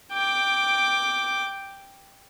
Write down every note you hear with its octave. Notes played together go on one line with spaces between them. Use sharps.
G5 D6